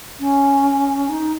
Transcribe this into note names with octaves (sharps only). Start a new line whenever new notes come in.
C#4
D#4